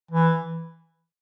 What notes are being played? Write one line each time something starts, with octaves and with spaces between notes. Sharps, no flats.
E3